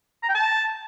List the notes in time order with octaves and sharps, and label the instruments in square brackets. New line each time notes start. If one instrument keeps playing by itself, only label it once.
[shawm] A#5
G5
A5